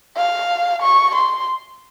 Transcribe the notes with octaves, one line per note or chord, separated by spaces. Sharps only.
F5
C#6
C6